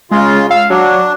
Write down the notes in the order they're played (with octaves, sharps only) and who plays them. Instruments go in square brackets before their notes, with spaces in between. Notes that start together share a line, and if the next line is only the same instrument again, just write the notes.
[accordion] C#3 F4 [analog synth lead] G#3
[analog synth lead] F5 [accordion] E6
[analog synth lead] F#3 [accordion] D4